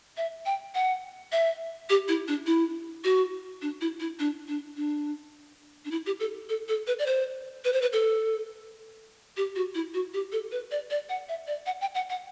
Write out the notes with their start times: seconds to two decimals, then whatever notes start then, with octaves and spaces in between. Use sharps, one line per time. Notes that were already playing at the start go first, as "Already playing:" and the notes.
0.17 E5
0.46 G5
0.75 F#5
1.32 E5
1.90 G4
2.08 E4
2.28 D4
2.47 E4
3.04 F#4
3.62 D4
3.81 E4
4.00 E4
4.19 D4
4.48 D4
4.77 D4
5.85 D4
5.91 E4
6.06 G4
6.20 A4
6.49 A4
6.69 A4
6.87 B4
6.99 D5
7.06 C5
7.65 B4
7.73 C5
7.82 B4
7.93 A4
9.37 G4
9.56 F#4
9.75 E4
9.94 F#4
10.14 G4
10.32 A4
10.52 B4
10.71 D5
10.90 D5
11.09 F#5
11.29 E5
11.47 D5
11.66 F#5
11.81 G5
11.95 F#5
12.10 F#5